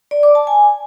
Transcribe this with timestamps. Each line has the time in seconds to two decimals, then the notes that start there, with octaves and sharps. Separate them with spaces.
0.11 D5
0.23 D6
0.35 A5
0.47 G#5